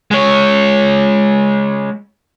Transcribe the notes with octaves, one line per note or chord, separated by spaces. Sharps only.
G#3 C#5